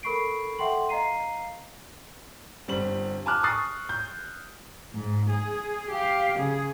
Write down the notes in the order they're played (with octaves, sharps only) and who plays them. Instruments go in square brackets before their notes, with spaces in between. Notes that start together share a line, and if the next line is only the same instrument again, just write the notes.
[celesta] A4 A#4 B5 C#6 C7 D7
A4 E5 F#5 G5 C6 F#7
D#5 F5 A#5 C7 D#7
[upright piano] G1 G3 C4 F#7
G#5 A5 D6 F6 F#6
C#6 D#6 F#6 A6 C7
G6
[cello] G#2
G#4
G4 F5
C#3 G#4